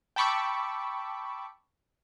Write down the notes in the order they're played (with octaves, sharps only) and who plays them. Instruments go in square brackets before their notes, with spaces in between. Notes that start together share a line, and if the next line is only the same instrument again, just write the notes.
[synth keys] G5 A5 B5 C#6 D6 E6